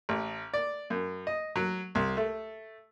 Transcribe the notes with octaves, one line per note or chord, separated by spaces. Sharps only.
A1
D5
F#2
D#5
F#3
C2
A3